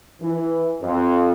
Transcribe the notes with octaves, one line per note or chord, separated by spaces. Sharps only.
E3
F2